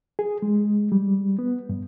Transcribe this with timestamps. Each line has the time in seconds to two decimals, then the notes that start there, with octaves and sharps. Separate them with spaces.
0.19 G#4
0.42 G#3
0.92 G3
1.39 B3
1.69 G2